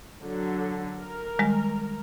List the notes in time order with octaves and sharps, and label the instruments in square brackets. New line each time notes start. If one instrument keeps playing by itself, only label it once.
[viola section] D3 F#3
A#4
[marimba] D#3 G3 G#3